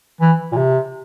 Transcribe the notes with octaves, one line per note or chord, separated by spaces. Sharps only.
E3
A#2
C3